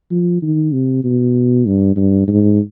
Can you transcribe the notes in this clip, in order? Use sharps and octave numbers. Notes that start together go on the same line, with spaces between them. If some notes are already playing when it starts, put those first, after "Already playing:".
F3
D#3
C3
B2
G2
G2
G#2